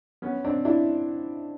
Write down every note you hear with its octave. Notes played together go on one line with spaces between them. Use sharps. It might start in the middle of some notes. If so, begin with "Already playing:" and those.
B3 C#4
C4 D4
D4 E4